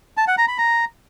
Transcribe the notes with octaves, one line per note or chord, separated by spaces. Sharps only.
A5
F#5
A#5
B5
A#5